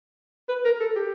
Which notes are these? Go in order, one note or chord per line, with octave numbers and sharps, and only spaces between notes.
B4
A#4
A4
G4